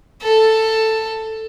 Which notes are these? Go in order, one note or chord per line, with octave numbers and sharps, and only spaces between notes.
A4